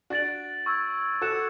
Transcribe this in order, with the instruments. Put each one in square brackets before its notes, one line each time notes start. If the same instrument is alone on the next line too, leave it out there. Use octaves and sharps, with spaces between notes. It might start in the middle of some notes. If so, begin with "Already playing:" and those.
[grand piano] D4 F#4 [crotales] F#6 A6 D7 F#7
[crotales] C#6 E6 G#6
[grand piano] F#4 A4 [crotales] D6 F#6 C#7 E7